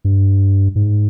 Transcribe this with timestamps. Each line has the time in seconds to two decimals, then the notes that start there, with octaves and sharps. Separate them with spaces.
0.04 G2
0.75 G#2